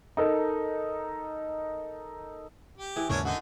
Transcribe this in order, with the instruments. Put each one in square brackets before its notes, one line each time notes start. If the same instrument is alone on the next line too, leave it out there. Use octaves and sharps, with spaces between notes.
[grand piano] D#4 A4 A#4
[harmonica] G4
[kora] E3 G#4
[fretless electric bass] D#2 G#2 C#3 [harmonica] C#4 D4 C#5 [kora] A#4
[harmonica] D3 D#4 [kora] F#4